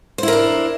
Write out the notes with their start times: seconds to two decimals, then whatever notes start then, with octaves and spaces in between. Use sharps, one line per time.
0.18 C5
0.23 E4
0.28 A#4
0.33 D4